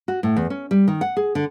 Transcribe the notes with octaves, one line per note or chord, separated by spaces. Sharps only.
F#4
A2
E2
C#4
G3
D#3
F#5
G#4
D3